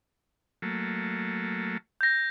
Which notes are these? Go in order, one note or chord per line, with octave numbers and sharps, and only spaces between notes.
F#3 A3 A#3
G6 A#6